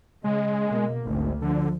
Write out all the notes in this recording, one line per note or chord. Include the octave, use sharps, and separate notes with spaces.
C#3 G#3 D#5
B2 A#3
G#1 D2 A3
D3 F3